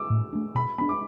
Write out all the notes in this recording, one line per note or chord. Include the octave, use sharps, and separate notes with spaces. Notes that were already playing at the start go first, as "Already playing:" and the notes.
Already playing: D6 E6
A2
A3 D4
B2 B5
B3 D4 B5
D6